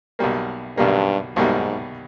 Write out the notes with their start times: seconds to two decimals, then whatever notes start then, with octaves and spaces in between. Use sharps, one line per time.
0.19 B1 B2 G3 A#3
0.77 B1 G2 B2 G3 A#3
1.36 B1 G#2 B2 G3 A#3